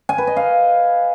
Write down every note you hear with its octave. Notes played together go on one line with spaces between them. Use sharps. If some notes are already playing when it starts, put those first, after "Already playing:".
G#5
B4
D#5
F5